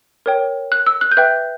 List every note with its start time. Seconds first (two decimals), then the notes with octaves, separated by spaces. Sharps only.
0.26 A#4 C#5 G5
0.72 F#6
0.87 E6
1.01 F#6
1.11 G6
1.17 B4 E5 G5 F#6